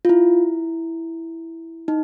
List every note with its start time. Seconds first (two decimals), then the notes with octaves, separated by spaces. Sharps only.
0.05 F4
0.09 E4
1.88 D#4